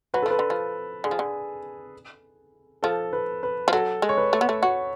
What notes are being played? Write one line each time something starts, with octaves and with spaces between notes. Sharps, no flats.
F#3 B4
A4
F3 B4
D3
F3
D3 G#4
F3
D3
F3 A4
B4
B4
F3
F#3 A4
G#3
C#5
B4
A3
B3
A3
F#4 C#5